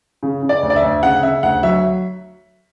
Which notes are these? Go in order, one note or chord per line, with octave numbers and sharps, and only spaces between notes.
C#3
C#3
D5
D2
D5
E5
D2
C#3 F#5
C#3 E5
D2 F#5
F#3 E5